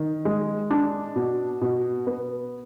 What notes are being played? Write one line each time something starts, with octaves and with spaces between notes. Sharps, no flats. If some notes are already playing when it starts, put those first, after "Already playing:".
Already playing: D#3
G#3
D4
B2
B2
B3